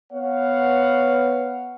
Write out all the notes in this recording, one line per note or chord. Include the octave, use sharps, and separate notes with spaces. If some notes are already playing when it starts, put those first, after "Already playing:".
B3 C#5 F5 F#5